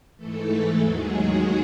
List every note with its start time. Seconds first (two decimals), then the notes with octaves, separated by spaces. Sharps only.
0.17 G#2 E3 A3 A4
0.80 D#2 D#3 F#3 G#3 G#4
1.11 F#3 F#4